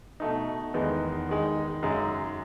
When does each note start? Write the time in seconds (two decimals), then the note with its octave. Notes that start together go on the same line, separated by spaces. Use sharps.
0.20 B2 A3 D#4
0.74 E2 D#3 G#3 B3 D#4
1.29 D#3 G#3 D#4
1.83 F#2 C#3 G#3 D#4